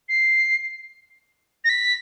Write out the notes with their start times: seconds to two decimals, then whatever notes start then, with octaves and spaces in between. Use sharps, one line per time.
0.08 C7
1.64 A#6
1.69 B6